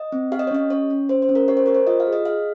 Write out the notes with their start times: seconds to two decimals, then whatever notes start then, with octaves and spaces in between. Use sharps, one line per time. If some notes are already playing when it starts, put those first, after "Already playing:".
Already playing: D#5
0.12 C4
0.32 G4 F5
0.39 D#5
0.47 C#5
0.51 C#4 D#5
0.70 C#4 C#5
0.90 C#4
1.09 C#4 C5
1.22 C5
1.29 C#4
1.35 A#4
1.48 G4 C#5
1.57 C5
1.66 G4 A#4
1.75 C5
1.87 F4 D#5
2.00 F5
2.06 G#4
2.13 D#5
2.26 G#4 F5